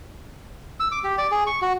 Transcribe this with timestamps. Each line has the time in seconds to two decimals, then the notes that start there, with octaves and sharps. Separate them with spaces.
0.80 E6
0.91 D6
1.04 G4
1.18 D5
1.31 G#4
1.47 C#6
1.62 F#4